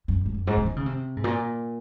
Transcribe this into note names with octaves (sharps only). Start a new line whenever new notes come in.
F#2
G#2
F#2
G#2
C#3
D#3
C#3
C3
G#2
A#2